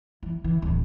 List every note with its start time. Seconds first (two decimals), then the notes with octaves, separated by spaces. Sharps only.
0.23 E3
0.44 E3
0.62 D1